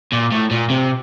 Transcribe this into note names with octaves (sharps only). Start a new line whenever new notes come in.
A#2
A2
A#2
C3